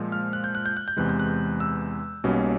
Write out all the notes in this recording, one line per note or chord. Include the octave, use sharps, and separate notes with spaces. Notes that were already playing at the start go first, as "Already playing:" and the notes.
Already playing: A#2 F3 G#3
F6
F#6
G6
F#6
G6
F#6
G6
E2 C3 E3 G#3 F#6
G6
F#6
E6
B1 B2 G3 A#3 C#4